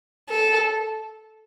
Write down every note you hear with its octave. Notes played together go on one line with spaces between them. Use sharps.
A4